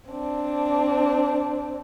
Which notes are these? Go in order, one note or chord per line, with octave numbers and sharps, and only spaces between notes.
C4 D4